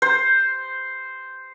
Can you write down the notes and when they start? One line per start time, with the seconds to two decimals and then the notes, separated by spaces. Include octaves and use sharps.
0.02 C5